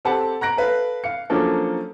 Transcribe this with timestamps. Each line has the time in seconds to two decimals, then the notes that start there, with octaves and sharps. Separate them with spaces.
0.05 C4 G4 A4 F#5 A5
0.41 A#5 F#6 A#6 D7
0.57 A4 B4 F5
1.04 F5 C#7
1.30 F3 F#3 A#3 C#4 D4 A4